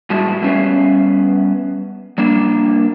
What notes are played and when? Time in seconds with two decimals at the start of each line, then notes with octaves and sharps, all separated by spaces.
0.10 A2 G3 G#3 E4 F#4 A5
0.42 G3 A3 B3 C#4 E5 F5
2.18 G3 A#3 D4